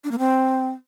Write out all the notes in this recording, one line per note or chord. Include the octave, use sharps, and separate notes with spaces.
D4
A#3
C4